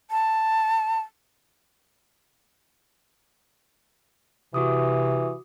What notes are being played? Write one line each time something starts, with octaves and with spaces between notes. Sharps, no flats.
A5
C3 E3 F#4 D6 D#6